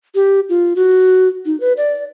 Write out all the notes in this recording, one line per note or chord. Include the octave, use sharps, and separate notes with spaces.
G4
F4
F#4
D#4
B4
D5